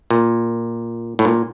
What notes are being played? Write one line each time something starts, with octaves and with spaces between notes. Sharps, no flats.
A#2
A2
A#2